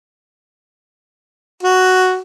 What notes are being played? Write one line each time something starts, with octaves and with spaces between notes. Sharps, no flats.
F#4